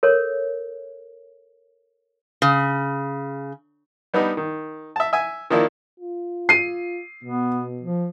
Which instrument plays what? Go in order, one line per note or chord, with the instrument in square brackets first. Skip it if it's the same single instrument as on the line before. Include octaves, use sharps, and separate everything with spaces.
[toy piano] A4 A#4 C#5
[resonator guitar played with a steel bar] C#3
[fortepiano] G3 B3 D4 D#4
D#3
E5 A5
E5 G#5
D#3 F3 A#3 D4 E4
[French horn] F4
[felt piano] C7 D#7
[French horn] B2 [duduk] B3
[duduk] F3